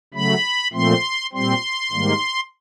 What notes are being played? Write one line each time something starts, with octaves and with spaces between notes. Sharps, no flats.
C#3 F#3 A3 B5
A#2 F3 A3 C4 C6
A#2 G3 C4 C6
G#2 D#3 G3 A#3